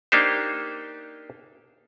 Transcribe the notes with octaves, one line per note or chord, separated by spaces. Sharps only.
A#3 D4 D#4 G4 C5